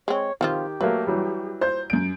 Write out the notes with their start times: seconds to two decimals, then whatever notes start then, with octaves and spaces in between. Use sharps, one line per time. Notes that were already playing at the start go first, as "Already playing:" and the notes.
0.08 G#3 C4 C#5
0.41 D#3 F3 C4 F4 G4
0.81 F#3 A3 A#3 B4
1.07 E3 F#3 G3
1.61 C5 G6
1.90 F#2 D7